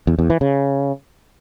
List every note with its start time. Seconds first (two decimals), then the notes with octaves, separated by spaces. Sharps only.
0.07 E2
0.19 E2
0.30 E3
0.41 C#3